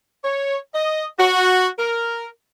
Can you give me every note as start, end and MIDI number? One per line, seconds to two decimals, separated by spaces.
0.24 0.58 73
0.74 1.05 75
1.19 1.68 66
1.79 2.27 70